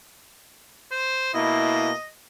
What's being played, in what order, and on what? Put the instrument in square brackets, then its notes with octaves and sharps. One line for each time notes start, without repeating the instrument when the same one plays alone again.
[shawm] C5
[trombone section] B2 A#3 E4 [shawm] D#5